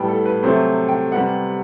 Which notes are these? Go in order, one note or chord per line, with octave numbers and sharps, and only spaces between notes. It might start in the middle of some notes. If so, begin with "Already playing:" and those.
Already playing: A2 G3 B3 G5 A5
A4
B4
C3 F#3 A3 C5
G5
C3 G3 B3 F#5